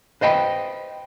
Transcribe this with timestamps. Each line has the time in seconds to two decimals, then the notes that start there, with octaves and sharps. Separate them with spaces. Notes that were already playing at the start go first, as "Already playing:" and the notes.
0.21 B4 C5 D#5 G5 A5 B5